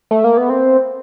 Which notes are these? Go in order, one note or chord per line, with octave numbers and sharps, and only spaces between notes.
A3
A#3
B3
C4